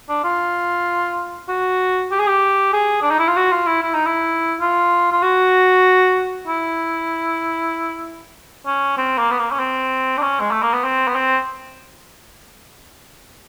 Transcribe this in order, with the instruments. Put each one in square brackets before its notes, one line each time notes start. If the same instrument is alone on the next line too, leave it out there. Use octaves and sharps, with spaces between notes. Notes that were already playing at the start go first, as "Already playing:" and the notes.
[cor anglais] D4
F4
F#4
G4
G#4
G4
G#4
D4
D#4
E4
F4
F#4
F4
E4
E4
D#4
E4
F4
F4
F#4
E4
C#4
C4
A#3
B3
A#3
C#4
C4
D4
C#4
G#3
A3
A#3
B3
C4
B3
C4